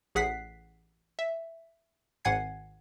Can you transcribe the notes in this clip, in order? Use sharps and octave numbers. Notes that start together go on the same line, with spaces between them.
A1 G#4 F#5 F#6 B6 C7
E5
G#1 G#2 F#5 G#5 G#6 C7